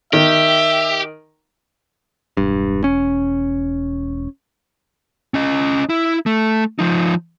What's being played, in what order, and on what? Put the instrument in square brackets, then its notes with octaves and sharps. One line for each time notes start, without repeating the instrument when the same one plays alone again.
[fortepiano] D#3 [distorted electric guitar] G4 [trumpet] E5
[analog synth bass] E1 [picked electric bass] G2
[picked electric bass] C#4
[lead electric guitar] C#4 D#5
E4
A3
F3 D#4